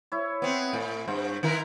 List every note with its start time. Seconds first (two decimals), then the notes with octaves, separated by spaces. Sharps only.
0.12 E4 C#5
0.42 B3 C4
0.73 A2
1.08 G2 C5
1.43 D#3 E4 A#4